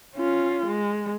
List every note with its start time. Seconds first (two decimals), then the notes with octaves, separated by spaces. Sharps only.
0.16 C#4 F4
0.66 G#3